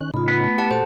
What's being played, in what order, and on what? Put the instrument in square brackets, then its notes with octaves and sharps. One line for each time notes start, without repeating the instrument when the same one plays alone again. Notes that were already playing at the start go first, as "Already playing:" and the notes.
[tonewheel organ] D#3 C#4 F#6
[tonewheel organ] A2 C#3 D#4 [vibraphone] F4 B5
[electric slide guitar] B3
[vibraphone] A3
[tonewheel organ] E4 D5 [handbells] G4 F#5 A5
[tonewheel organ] A#2 F#4 [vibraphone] A4 A5 [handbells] C5